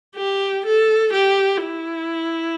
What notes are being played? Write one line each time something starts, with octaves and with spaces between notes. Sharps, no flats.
G4
A4
G4
E4